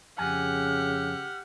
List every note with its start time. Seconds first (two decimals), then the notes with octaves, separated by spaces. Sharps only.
0.18 F2 C#3 G4 F#5 G#5 F6